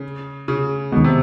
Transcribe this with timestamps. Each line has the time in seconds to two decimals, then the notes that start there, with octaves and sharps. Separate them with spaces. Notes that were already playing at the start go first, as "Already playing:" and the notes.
Already playing: C#3
0.48 C#3
0.92 D#2 B2 D#3 G#3 B3
1.04 C3